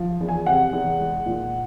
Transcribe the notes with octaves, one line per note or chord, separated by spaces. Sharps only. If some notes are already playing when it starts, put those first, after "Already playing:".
Already playing: F3
E2
G#5
C3 F#5
E2
G#3
A#2